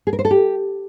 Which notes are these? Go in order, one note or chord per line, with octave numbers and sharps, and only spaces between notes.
G#4
A#4
C5
A4
G4